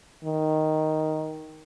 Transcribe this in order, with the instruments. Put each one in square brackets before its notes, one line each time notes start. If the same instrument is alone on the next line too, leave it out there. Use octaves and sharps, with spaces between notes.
[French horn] D#3